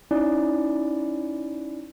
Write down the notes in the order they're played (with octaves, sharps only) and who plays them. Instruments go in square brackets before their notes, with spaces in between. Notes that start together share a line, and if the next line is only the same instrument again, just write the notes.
[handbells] C#4 D#4 E4 D5